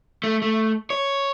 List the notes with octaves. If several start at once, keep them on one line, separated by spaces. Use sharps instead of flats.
A3
A3
C#5